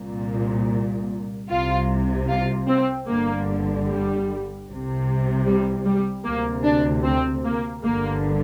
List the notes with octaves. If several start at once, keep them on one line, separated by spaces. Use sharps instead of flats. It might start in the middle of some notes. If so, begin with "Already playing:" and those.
Already playing: C2 A#2
C2 C3 F4
F4
C4
G1 G2 D3 A#3
G3
C2 C3
G3
G3
D2 C3 A#3
D4
C4
A#3
G1 G2 D3 A#3